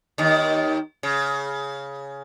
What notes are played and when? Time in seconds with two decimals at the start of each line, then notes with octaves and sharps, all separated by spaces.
0.18 D#2 D#3
1.03 C#3